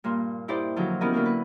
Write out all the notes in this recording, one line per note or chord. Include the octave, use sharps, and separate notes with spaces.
G2 A#2 A#3 C6
D#4 E4 G4 C5 D5
D3 D#3 F3 F#3
B3 C#4 E4 G4 A#4 D#5
D3 F#3 A#3 A#4
B4